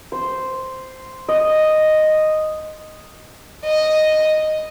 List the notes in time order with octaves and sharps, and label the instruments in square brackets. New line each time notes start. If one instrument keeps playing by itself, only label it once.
[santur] C5
D#5
[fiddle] D#5